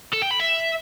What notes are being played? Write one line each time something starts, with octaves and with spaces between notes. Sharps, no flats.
A4
G5
B5
E5